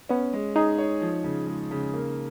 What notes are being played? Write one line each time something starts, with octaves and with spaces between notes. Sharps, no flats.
B3 C#4
G#3
D#4 G#4
C#5
F3
C#3
G#3
C#3
A#3